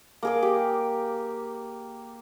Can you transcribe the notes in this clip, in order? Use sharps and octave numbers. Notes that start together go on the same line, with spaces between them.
A#3 G#4 D6
G4